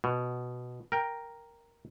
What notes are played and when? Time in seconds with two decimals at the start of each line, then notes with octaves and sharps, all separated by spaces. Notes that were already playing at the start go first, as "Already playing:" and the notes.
0.04 B2
0.92 A#4 G5